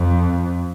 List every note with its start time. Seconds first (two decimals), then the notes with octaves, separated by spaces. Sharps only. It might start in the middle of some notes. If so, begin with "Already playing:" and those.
Already playing: F2